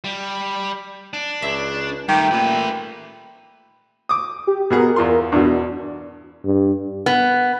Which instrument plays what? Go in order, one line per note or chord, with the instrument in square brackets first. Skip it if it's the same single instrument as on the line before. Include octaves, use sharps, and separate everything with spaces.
[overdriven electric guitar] G3
D4
[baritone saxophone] C#2 [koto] E5
[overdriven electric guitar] G2 A3 [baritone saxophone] D#3 [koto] G4
[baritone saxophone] A#2 [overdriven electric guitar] A3 B4
[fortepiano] D6 D#6
[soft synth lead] G4
[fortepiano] B2 B3 G#4 [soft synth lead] A#4
[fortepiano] E2 F4 C6
[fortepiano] E2 B2 [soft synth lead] D4
[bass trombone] G2
[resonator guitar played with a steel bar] B3